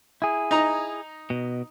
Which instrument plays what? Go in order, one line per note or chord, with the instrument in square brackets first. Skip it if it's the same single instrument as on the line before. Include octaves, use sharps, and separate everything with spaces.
[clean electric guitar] E4 G#4
[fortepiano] D#4 A#5
[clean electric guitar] B2